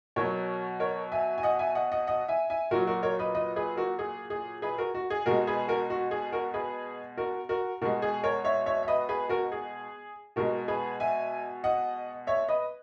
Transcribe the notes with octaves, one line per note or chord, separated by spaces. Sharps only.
B2 F#3 A#4 C#5
A#4 C#5
E5 G#5
G#5
D#5 F#5
E5 G#5
D#5 F#5
D#5 F#5
D#5 F#5
E5 G#5
E5 G#5
A#2 F#3 F#4 A#4
F#4 A#4
A#4 C#5
B4 D#5
B4 D#5
G#4 B4
F#4 A#4
G#4
G#4
G#4 B4
F#4 A#4
F#4
G#4
B2 G#3 F#4 A#4
G#4 B4
F#4 A#4
F#4
G#4
F#4 A#4
G#4 B4
F#4 A#4
F#4 A#4
B2 G#3 F#4 A#4
G#4
A#4 C#5
C#5 E5
C#5 E5
E5
B4 D#5
G#4 B4
F#4 A#4
G#4
B2 G#3 F#4 A#4
G#4 B4
E5 G#5
D#5 F#5
C#5 E5
B4 D#5